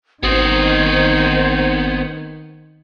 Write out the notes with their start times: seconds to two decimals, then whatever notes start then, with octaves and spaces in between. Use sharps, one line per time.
0.23 G#1 D#3 B3 C4 C5 D#6 G#6